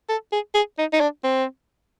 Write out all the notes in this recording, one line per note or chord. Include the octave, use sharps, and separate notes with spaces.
A4
G#4
G#4
D#4
D#4
D4
C4